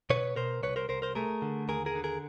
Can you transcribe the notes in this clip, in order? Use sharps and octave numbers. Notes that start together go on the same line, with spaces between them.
B2 B4 C#5
B2 A#4 C5
C2 B4 C#5
A#4 C5
C2 A#4 C5
A#4 C5
A3 G#4 A#4
D3
D#2 G#4 A#4
G#4 A#4
D3
G#4 A#4